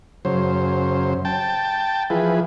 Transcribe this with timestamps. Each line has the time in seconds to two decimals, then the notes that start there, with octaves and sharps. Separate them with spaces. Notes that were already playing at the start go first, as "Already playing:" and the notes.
0.25 F#2 C#3 C5
1.25 G5 A5
2.10 E3 F3 G#4 B4